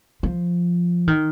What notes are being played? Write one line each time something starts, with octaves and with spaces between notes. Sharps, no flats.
F3
D#3